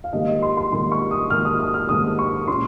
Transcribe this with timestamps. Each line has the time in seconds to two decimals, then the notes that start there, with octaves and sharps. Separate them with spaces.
0.04 F5
0.13 G#2 D#3 G3 A#3 D#5
0.28 D#5
0.42 C6
0.57 C6
0.72 G#2 D#3 G3 A#3 C6
0.92 C#6
1.11 D#6
1.30 G#2 D#3 G3 A#3 F6
1.45 D#6
1.60 D#6
1.74 F6
1.89 G#2 D#3 G3 A#3 D#6
2.19 C#6
2.48 A#2 G#3 C#4 C6